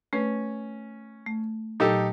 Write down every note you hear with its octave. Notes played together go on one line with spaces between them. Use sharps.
A3 C#4 B4
A3
A#2 F#3 D#4 G4 A4